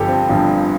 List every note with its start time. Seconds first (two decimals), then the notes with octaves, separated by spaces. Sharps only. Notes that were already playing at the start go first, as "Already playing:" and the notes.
Already playing: G1 G2 F3 G4 A4
0.08 C4
0.29 G1 G2 F3